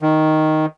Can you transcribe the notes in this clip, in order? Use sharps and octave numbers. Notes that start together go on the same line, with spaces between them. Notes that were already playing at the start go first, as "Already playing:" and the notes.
D#3